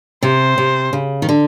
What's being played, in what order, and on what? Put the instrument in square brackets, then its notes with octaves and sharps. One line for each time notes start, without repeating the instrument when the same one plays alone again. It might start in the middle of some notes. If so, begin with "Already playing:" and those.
[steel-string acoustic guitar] C3 [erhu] C5
[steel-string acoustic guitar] C3
C#3
D#3
D3